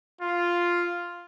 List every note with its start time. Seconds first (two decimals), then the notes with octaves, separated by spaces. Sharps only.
0.21 F4